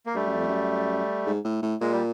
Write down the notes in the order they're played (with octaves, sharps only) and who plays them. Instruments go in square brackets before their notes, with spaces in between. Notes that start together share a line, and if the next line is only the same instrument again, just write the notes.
[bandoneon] A#3
[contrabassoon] G2 [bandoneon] G3 A3
[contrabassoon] F#2
F2
F#2
G#2
A2
A2
[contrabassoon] A#2 [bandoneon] G#3
[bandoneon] G3